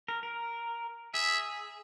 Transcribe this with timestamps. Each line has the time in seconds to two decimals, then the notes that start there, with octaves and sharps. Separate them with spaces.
0.08 A#4
0.23 A#4
1.14 G#4 E5